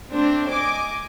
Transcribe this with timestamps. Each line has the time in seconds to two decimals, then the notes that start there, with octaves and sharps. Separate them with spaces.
0.11 A3 C4 D4 C5
0.49 D#5 G#5 D6